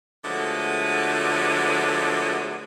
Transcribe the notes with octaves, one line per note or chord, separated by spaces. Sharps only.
D3 F3 F#3 G#3 A3 B3